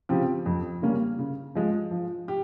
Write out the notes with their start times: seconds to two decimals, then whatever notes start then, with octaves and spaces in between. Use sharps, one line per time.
0.09 C#3 F3 C4 G4
0.46 F2
0.82 C#3 G3 A#3 C#4
1.19 C#3
1.55 F3 G#3
1.91 F3
2.28 G4